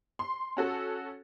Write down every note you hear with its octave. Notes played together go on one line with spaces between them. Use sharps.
C6
C#4 F#4 A4